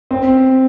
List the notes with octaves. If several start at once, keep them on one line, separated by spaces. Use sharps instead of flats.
C4